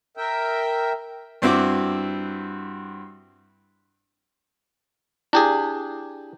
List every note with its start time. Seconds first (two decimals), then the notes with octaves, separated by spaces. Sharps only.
0.17 A#4 E5 G5
1.42 G2 C4 E4 F#4 D6
5.33 D4 E4 G4 G#4